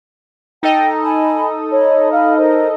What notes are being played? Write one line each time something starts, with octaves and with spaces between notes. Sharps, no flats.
D#4 A4 D#5 G5
G#5 A5 B5
C#5 B5
F5 B5 F6
A#4 C5